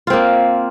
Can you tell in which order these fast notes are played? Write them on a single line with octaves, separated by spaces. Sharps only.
F4 C4 A#3